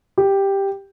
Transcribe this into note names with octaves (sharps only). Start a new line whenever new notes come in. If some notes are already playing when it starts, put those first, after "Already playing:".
G4